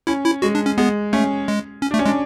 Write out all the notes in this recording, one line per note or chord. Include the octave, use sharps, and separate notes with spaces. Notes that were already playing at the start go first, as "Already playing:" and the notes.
C#4 E4
E4
G#3 F#4
D4
C#4
G#3 B3
A3 C#4
G#3
C#4
A3 D4
C#4
G#3 D4